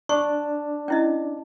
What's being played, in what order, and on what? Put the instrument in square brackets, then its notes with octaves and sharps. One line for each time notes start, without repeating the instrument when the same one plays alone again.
[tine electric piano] D4 [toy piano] C#6
[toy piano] C#4 E4 D#5